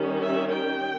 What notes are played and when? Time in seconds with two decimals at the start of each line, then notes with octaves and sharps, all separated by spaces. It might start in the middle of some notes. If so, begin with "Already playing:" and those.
Already playing: D#3 G3 C#4
0.21 E5
0.51 G5